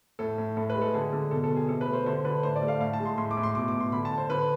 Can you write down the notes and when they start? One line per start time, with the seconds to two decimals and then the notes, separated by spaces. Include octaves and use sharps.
0.19 A2 A4
0.38 A2
0.57 A2 A4
0.70 B4
0.75 G#3
0.82 A4
0.94 D3 G#4
1.13 D3
1.31 B2 A4
1.44 A4
1.50 B2
1.56 G#4
1.69 C3 A4
1.81 B4
1.87 A3
1.93 C5
2.06 D3 C5
2.25 D3 B4
2.43 A2 C5
2.56 D5
2.62 A3
2.68 F5
2.80 A2 F5
2.93 A5
3.00 G#3
3.05 C6
3.18 A2 C6
3.31 D6
3.37 A2
3.43 C6
3.55 B2 D6
3.68 D6
3.74 B2
3.80 C6
3.92 D3 B5
4.05 A5
4.11 D3
4.18 C5
4.30 D3 B4